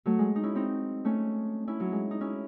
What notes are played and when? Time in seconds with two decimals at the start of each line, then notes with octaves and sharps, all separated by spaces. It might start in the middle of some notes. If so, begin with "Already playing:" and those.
0.06 F#3 A3
0.19 G#3
0.36 D#4
0.43 C#4 E4
0.55 C4 D#4
1.05 A3 C#4
1.67 C#4 E4
1.80 F#3
1.92 G#3
2.11 D#4
2.21 C#4 E4